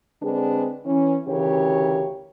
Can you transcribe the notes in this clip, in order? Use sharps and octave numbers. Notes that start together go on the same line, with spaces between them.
D3 G#3 C4 D4 G#4 B4
E3 C#4
D2 C#3 E3 G4 A#4 C#5